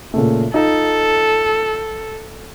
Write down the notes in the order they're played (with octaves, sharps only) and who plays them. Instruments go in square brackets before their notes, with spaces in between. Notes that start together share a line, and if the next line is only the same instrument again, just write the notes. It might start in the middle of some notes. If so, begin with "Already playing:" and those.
[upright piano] A#2 C#3 A3
[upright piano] D#4 F4 [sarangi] A4